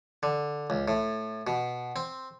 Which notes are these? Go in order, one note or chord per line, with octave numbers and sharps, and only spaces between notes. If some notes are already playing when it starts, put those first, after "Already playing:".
D3
C#2
A2
B2
C4